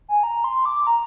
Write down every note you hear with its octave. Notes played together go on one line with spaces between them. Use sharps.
G#5
A#5
C6
D6
A#5